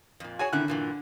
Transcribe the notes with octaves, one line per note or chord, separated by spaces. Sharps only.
F2 A#2
F#4 G#4 C#5 G#5
D3 D#3 E4 F#6
G2 A#2 E3